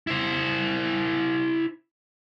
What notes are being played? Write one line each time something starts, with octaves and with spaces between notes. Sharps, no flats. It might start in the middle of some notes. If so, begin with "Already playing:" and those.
E4 C5